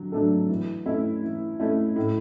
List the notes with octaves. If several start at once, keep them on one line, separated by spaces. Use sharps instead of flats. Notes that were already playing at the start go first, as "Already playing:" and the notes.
Already playing: D3 F#3
F#3 A3 D4 A4
E3
A3 C#4 E4
E3
A3 C#4 E4
A2